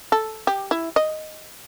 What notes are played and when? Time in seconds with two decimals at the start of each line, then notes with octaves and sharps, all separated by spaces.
0.12 A4
0.47 G4
0.71 E4
0.96 D#5